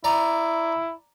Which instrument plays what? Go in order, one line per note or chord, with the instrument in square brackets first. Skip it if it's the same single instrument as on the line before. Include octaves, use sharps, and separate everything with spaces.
[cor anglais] E4 [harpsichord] D5 A#5